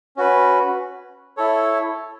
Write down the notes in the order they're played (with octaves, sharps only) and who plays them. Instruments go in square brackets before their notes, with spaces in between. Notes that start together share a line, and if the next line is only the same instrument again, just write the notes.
[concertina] C#4 F#4 B4
E4 A4 C#5